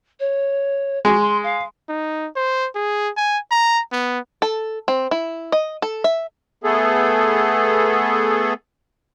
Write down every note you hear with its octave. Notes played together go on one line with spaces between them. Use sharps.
C#5
G#3 F#4
C6
F5
D#4
C5
G#4
G#5
A#5
B3
A4
C4
E4
D#5
A4
E5
A3 B3 G#4 A4